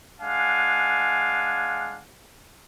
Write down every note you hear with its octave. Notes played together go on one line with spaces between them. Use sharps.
G#3 D4 F5 F#5 G#5